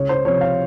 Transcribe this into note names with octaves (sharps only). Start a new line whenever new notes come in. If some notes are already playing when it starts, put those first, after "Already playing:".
Already playing: C#2 C#5
C5
C3 F3 C#5
F5